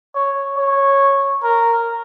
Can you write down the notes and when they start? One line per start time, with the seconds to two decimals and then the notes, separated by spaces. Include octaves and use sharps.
0.15 C#5
0.58 C#5
1.43 A#4